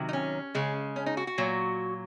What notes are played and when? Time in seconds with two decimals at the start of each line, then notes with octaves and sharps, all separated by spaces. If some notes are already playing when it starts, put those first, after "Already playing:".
Already playing: C3 D#3 F#3
0.09 D#4
0.13 C#4
0.55 C#3 G#3
0.96 C#4
1.06 D#4
1.17 F#4
1.27 F#4
1.38 A#2 F#3